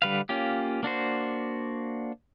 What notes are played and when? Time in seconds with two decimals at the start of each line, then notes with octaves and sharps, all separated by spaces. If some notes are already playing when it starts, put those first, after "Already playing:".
0.02 D3 G3 B4 F5
0.29 A#3 C#4 F4 G4
0.83 A#3 D4 F#4 C5